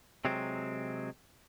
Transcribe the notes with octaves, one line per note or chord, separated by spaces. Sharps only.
C3 F#3 G#3 C4